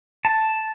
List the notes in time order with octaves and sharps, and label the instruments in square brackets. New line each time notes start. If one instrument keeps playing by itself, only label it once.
[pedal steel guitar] A5